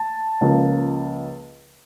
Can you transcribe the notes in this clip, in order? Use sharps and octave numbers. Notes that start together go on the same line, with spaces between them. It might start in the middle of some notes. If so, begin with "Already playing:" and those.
Already playing: A5
C#2 C#3 F3 A#3